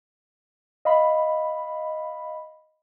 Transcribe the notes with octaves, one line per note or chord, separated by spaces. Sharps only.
D#5 F5 B5